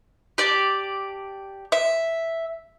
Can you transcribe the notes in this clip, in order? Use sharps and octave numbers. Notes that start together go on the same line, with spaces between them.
G4 D5 A5
E5